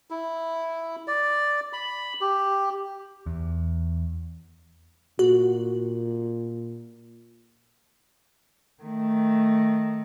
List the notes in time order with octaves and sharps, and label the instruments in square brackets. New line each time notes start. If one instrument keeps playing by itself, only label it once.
[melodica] E4
D5
B5
G4
[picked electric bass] E2
[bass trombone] A#2 [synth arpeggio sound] F#4
[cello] D#3 A3